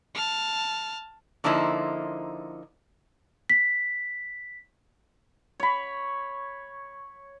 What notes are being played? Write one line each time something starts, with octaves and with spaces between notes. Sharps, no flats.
A5 F6
D3 F3 A#3 D#4 E4 C5
B6
C#5 B5